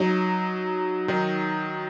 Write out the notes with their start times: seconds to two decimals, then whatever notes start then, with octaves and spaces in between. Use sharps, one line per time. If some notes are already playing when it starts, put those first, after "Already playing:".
Already playing: F#3 D#4
1.08 D#3 F#3 D#4